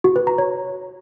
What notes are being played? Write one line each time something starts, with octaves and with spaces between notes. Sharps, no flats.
F#4
B4
A#5
C#5